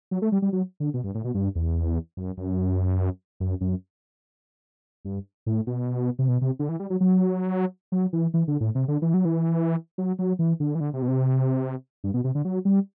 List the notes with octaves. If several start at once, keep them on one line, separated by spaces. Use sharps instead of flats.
F#3
A3
G3
G3
F#3
D3
B2
G2
A2
B2
G2
E2
F#2
F#2
F#2
F#2
G2
A2
B2
C3
B2
C3
D3
E3
G3
F#3
F#3
F#3
E3
E3
D3
A2
C3
D3
E3
F#3
E3
F#3
F#3
E3
D3
E3
D3
C3
B2
C3
G2
B2
C3
D3
F#3
G3